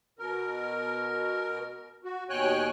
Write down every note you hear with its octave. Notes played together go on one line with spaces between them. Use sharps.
B2 A#4
F#4
D#2 B2 C#5 G5 G#5 F#6